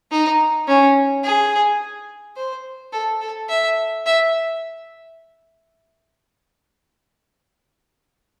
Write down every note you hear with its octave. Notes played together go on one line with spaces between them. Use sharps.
D#4
C#4
G#4
C5
A4
A4
E5
E5